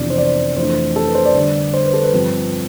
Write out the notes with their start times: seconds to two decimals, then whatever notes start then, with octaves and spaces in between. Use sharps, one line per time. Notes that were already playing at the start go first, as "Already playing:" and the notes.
Already playing: F2 C3 E3 B3 D4 D5
0.10 C5
0.18 D5
0.56 F2 E3 A3 D4 C5
0.96 A4
1.06 B4
1.15 C5
1.25 D5
1.35 D3 G3 D4
1.73 C5
1.83 B4
1.93 A4
2.03 B4
2.13 G2 F3 C4